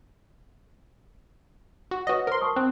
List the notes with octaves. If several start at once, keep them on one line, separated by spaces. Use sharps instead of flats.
F#4
F#4 B4 C#5 D#5 A#6
A#4 C5 C6
A5 C#6 D#6
C4 F#6